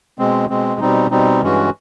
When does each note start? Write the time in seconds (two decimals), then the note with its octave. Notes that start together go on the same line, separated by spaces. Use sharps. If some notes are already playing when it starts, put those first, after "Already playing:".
0.19 B2 G#3 C4
0.49 B2 G#3 C4
0.80 B2 G3 C4 D#4
1.11 B2 G3 C4 D#4
1.42 G2 E3 G#3 C#4 F#4